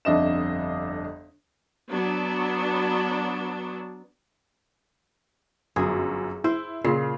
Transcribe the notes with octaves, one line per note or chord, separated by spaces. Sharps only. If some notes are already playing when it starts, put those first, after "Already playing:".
G1 F2 D4 D#5 E5 E7
F#3 B3 D4
G1 F#2 G#4
E4 C5
A#2 C#3 C7